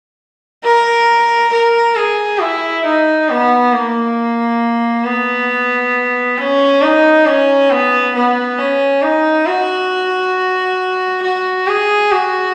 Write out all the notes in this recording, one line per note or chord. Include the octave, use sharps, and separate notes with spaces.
A#4
A#4
G#4
E4
D#4
B3
A#3
B3
C#4
D#4
C#4
B3
B3
C#4
D#4
F#4
F#4
G#4
F#4